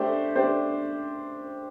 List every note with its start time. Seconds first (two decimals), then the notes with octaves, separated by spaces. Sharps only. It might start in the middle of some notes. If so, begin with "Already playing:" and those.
Already playing: A3 D4 G4 C5
0.36 A3 D4 G4 C5